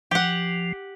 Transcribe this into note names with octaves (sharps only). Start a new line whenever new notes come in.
F3 G4 F#5